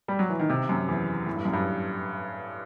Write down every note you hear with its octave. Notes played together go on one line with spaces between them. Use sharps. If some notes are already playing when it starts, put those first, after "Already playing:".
G3
F#3
E3
D#3
C3
F#2
E2
A2
G2
F#2
G2